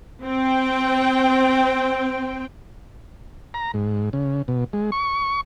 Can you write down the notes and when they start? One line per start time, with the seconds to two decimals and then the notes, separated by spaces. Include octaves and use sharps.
0.24 C4 G5
3.54 A#5
3.74 G#2
4.13 C#3
4.48 B2
4.73 G#3
4.92 C#6